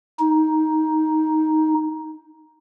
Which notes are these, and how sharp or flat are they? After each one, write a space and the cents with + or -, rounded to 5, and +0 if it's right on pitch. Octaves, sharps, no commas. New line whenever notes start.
D#4 +10